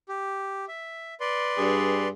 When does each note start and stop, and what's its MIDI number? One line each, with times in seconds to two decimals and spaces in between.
0.09 0.65 67
0.68 1.14 76
1.20 2.08 71
1.20 2.08 74
1.20 2.08 84
1.56 2.09 43
1.56 2.09 68